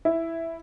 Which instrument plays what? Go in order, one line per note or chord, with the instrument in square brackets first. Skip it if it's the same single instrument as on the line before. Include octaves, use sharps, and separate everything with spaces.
[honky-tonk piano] E4